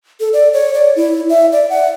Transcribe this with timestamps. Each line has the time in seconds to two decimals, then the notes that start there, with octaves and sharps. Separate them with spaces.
0.20 A4
0.33 D5
0.53 C#5
0.74 D5
0.96 E4
1.30 E5
1.52 D5
1.70 F#5